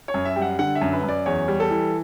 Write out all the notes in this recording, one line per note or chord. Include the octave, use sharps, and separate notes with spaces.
C#5
F#2
E5
G3 G5
F#5
D3 F#5
E5
F#2
B4
F#2 D5
E2 C#5
G3
A4
E3